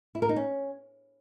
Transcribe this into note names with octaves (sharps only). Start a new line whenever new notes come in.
E4
A#4
D#4
C#4